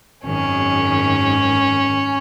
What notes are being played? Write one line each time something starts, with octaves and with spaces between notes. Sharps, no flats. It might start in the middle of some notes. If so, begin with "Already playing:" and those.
G#1 F#2 D#3 C#4